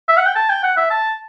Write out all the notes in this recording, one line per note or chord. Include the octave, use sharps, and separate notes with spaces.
E5
F#5
G5
A5
G5
F#5
E5
A5